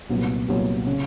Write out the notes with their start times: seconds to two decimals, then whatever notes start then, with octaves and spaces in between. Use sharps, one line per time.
0.09 C2 A#2 F#3 B3
0.48 C2 A#2 F#3 B3
0.86 C#3